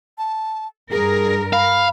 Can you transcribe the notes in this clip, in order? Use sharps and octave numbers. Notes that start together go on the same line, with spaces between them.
A5
G2 G#4 A#4
F5 B5